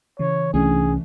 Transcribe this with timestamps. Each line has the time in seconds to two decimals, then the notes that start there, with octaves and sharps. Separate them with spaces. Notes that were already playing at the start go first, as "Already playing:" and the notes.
0.19 C#3 E3 C#5
0.54 C2 E3 A3 C#4 D4 G#4